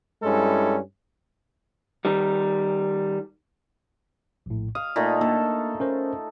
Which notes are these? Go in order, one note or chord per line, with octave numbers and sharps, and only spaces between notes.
G2 G#3 C#4 E4 A4
D#3 G3
A#1 A2
F5 D#6
A#2 A3 D#4
A#3 D4 A4
C#4 A#4 C5